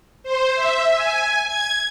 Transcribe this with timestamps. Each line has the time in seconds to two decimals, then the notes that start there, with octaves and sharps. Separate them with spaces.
0.23 C5
0.54 E5
0.93 G#5
1.45 G#6